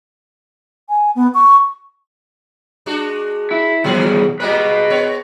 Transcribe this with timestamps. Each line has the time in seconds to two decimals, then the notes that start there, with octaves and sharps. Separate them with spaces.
0.89 G#5
1.16 B3
1.34 C#6
2.86 G#3 D4 F#4
3.51 E4
3.84 B2 D#3 F3 G3 G#4
4.40 G3 G#3 A#3 B4 D#5
4.90 B3 C#5